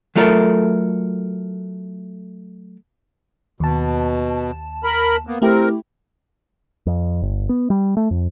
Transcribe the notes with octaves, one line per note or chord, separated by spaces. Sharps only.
F#3 A3 F4 A4 A#4
D#2 B2 A5
A#4 B5
A#3 B3
A3 C4 E4 G4 A#4
F2
G1
B3
G3
A3
F2